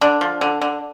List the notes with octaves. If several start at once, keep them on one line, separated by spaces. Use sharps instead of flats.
D3 D4
F3
D3
D3